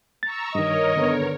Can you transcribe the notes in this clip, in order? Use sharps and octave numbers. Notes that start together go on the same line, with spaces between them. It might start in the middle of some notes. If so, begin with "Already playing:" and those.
A#5 C#6 E6 A6
G2 D#3 A#4 C#5 D#5
D3 B3